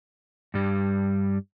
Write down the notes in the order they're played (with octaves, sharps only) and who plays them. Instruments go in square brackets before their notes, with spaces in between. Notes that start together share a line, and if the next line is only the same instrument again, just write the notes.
[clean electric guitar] G2 G3